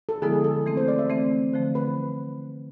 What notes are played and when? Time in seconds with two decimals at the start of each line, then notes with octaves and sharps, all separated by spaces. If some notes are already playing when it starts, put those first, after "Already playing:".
0.09 A4
0.22 D3 F3 G#3 B3 E4 G#4
0.44 A4
0.66 E3 A3 C4
0.77 C5
0.88 D5
0.99 E5
1.09 E3 A3 C4
1.53 D3 F3 A3 C5
1.75 B4